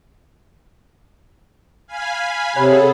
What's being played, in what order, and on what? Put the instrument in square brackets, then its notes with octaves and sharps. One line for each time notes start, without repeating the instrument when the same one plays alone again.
[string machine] F5 G#5 B5
[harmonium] C3 [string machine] G#4 A4 [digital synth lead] C#5 [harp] F#5 G#5 B5